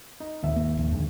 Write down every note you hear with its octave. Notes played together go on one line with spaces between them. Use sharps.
D#4
D#1 G#1 E5
A#3
A#1 D#2
F2 D3 G#3